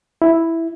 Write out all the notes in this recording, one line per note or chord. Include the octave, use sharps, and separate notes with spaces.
E4